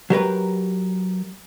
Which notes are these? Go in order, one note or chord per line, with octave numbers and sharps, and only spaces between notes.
F#3 G4 A#4 B4